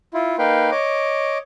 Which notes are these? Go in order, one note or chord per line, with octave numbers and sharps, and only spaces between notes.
E4 F4
A#3 D#4 B4 F5 G5
C#5 D#5 D6